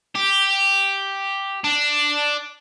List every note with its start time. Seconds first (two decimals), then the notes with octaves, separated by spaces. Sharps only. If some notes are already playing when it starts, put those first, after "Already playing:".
0.16 G4
1.64 D4